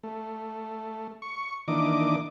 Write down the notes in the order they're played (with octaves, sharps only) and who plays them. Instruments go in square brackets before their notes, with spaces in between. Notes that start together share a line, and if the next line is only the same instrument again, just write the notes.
[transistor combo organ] A3
C#6
D#3 E3 A#3 D4 D#5 D6